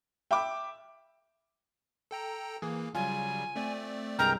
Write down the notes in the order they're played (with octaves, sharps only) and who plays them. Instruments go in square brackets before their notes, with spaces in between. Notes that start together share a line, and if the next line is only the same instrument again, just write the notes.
[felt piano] E5 [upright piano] G5 B5 D6
[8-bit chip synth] A4 G5 A#5
[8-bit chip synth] E3 A#3 [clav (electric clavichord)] G#4
[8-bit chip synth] C#3 F#3 G3 [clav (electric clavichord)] F4 [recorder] G#5
[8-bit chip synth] A3 C4 D5
[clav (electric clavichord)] C2 G2 G#3 [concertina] A#4 G5 [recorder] A#5